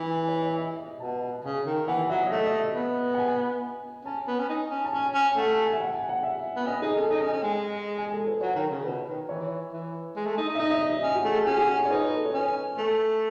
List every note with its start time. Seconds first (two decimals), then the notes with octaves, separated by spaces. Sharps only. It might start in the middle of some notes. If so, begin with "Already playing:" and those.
Already playing: E3 G#5
0.14 G#5
0.28 C#5
0.42 D#5
0.57 E5
0.79 D#5
1.00 B2 A5
1.44 C#3 G#5
1.66 D#3
1.87 E3 F#5
2.09 F#3 E5
2.23 D#5
2.31 A3 E5
2.46 D#5
2.61 E5
2.75 B3
3.14 F#5
3.19 G#5
4.05 C#4 A5
4.28 B3
4.39 C#4
4.49 D#4
4.71 C#4
4.85 A5
4.93 C#4 G#5
5.14 C#4
5.32 G#5
5.36 A3 F#5
5.51 A5
5.66 G#5
5.73 E5
5.80 F#5
5.94 G#5
6.09 F#5
6.23 E5
6.56 B3
6.66 C#4 D#5
6.82 D#4 G#4
6.96 C#4 A4
7.11 D#4 D#5
7.22 C#4
7.33 C#4
7.43 G#3
7.98 G#5
8.12 A4
8.23 A4
8.27 B4
8.41 F#3 C#5
8.56 D#3
8.71 C#3
8.84 B2 B4
9.07 D#3
9.29 E3 C#5
9.72 E3
10.16 G#3
10.26 A3
10.38 D#4
10.49 D#4
10.55 E5
10.59 D#4 D#5
10.70 E5
10.81 D#5
10.92 D#5
11.03 C#4
11.15 F#4
11.25 A3 G#4
11.46 C#4 G#4
11.57 F#4
11.68 F#4
11.79 G#4
11.85 C#5
11.90 D#4 B4
12.12 A4
12.25 C#5
12.34 C#4 B4
12.77 A3 A4